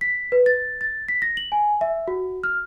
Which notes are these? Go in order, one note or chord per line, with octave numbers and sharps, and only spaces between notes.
B6
B4
A6
A6
B6
A#6
F#7
G#5
E5
F#4
F6